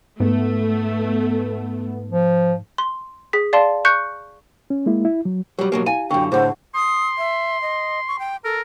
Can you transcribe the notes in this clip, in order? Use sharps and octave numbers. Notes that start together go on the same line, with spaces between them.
G#2 A3 B3
F3
C6
G#4 B6
D5 F5 A5 C6
C#6 F#6 G6 C#7
C#4
G#3 A#3 E4
E4
F#3
F#3 G3 G4
B2 F#3 A#3
E4 F5 G#5
F#2 D3 G5 C#6
A2 D3 E4 G#4 C5 F#5
C6 D#6
E5
D#5
C#6
G5
A4 A#4